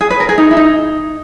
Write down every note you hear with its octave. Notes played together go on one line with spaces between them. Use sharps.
G#4
B4
A#4
G#4
D#4
E4
D#4